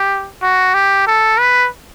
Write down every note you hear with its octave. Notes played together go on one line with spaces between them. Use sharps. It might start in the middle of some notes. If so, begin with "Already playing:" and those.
Already playing: G4
F#4
G4
A4
B4